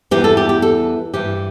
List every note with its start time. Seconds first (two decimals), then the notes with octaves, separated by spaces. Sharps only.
0.11 E2 E3 G3 G4
0.24 A4
0.37 G4
0.49 G4
0.62 A4
1.14 G2 E3 G3 G4